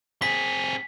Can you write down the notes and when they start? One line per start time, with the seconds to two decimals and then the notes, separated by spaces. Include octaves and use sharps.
0.22 C4 G#4 B6